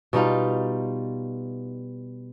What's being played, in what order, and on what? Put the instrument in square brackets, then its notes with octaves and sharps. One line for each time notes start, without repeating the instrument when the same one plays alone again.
[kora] B2 G3 D#4 F4